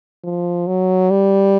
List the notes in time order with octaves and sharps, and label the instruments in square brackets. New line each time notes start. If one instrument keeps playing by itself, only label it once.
[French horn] F3
F#3
G3